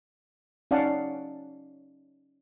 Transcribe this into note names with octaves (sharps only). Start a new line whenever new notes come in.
C#4 D#4 D5 F5 F#5 A5